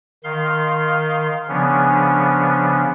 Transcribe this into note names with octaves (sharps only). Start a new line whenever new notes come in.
D#3 F5 C6
C#3 F3 B3 C#4 D4